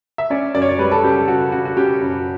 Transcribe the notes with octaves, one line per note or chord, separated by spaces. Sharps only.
E5
C#4 D5
F#2 D5
C#5
D5
G3 B4
A4
C#3 G4
A4
C#3 F#4
C#3 F#4
F#4
C#4 G4
F#2